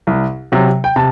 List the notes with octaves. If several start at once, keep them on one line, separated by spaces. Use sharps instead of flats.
C2
C3 F#3
G5
C3 A5